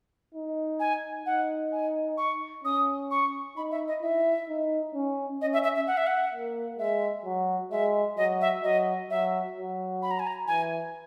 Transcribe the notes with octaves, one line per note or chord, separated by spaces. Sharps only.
D#4
G#5
D#4 F#5
G#5
C#6
C#4 D#6
C#6
D#4 B5
E5
D#5
E4 E5
D#4
C#4
C#4 D#5
E5
E5
E5
F#5
E5
F#5
A#3
G#3 E5
F#3
G#3 E5
F#3 D#5
E5
F#3 D#5
F#3 E5
F#3
B5
A#5
G#5
A#5
E3 G#5